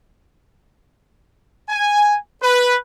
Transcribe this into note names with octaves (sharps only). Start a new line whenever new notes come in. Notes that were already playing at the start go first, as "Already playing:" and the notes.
G#5
B4